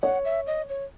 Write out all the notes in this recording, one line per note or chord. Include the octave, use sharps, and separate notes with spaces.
C#5 F#5
E5
D#5
C#5